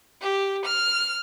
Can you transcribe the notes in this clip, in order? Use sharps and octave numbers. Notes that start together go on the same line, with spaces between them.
G4
F6